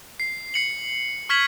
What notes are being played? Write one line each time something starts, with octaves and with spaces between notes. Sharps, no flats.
C7
C7 C#7 F#7
C#6 F6 G#6 B6 E7 F#7